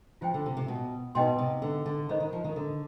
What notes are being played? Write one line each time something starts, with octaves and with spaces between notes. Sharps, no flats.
F3 F4 C5 G5
D3
C3
C3
B2
B2 D#4 B4 D#5 G5 C6
C3
D3
D3
D#3 C5 D#5 B5
D#3
F3
D#3
D3